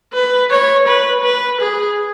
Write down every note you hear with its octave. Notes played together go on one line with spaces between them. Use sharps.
B4
C#5
B4
B4
G#4